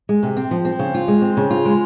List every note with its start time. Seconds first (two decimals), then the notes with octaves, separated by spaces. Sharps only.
0.09 G#3
0.23 C3
0.37 C4
0.51 F3
0.65 C4
0.79 C#3
0.94 F4
1.08 G#3
1.22 C4
1.37 C#3
1.51 F4
1.65 G#3